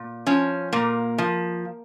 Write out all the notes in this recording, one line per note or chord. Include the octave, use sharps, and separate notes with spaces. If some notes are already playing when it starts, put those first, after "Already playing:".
Already playing: A#2
F3 C#4
A#2 A#3
F3